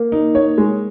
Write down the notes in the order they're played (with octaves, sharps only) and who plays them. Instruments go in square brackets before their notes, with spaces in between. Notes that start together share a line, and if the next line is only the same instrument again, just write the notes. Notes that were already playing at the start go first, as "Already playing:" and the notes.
Already playing: [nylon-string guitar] A#3
[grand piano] D#4
C#5
G#3